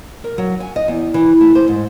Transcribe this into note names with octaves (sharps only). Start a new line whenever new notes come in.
A#4
F#3
G#5
D#5
E2
E3
A3
C5
G#2